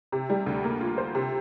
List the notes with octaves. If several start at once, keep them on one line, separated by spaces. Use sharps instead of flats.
C3
G3
D2
A#3
F4
C5
C3